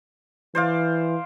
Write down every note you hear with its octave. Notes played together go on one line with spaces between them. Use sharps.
E3 C5 D5 F5